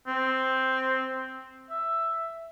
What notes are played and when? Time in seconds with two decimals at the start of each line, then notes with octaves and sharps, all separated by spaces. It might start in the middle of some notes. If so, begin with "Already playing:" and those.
0.07 C4
1.70 E5